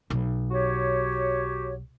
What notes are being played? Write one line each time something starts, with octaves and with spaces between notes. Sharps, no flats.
B1
F#4 G4 C#5